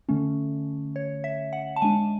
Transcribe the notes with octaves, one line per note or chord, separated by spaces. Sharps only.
D3 A3 C#4
C#5
E5
F#5
A5
G#3 D4 G#5